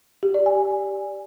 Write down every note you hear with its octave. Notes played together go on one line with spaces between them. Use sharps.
G4
D5
G#5